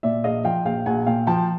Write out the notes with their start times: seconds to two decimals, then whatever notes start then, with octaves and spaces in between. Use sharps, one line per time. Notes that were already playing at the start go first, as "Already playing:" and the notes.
0.03 A#2 D5 E5
0.24 A#1 D#5 F5
0.44 F3 F5 G5
0.65 A#1 F5 G5
0.86 A#1 F#5 G#5
1.07 A#2 F5 G5
1.27 F3 G5 A5